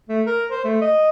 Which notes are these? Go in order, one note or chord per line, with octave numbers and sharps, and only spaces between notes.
A3
A#4
C5
A3
D#5